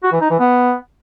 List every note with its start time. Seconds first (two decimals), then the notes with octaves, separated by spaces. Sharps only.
0.03 F#4
0.12 E3
0.21 D#4
0.30 E3
0.39 B3